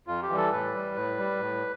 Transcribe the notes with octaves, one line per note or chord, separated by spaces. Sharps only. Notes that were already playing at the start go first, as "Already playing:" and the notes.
F2 F4
G4
E3 G3
A4
A2 B4
G3
A2
G3
A2